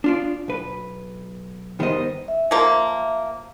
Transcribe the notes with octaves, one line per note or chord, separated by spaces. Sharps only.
D4 F4 D5
B1 B4
G2 D#3 G3 B3 C5 D#5
E5
F3 A#3